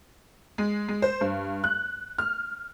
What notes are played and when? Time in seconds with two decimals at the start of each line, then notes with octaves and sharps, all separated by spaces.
0.58 G#3
0.88 G#3
1.02 C5
1.21 G2
1.64 F#6
2.18 F6